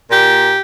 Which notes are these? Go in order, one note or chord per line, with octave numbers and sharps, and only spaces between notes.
A#2 G4